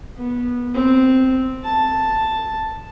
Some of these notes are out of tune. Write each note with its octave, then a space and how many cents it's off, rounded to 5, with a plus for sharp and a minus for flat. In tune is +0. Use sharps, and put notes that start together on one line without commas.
B3 -15
C4 -5
A5 +0